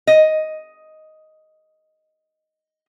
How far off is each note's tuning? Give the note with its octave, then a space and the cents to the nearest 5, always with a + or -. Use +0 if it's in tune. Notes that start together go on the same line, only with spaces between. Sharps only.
D#5 +5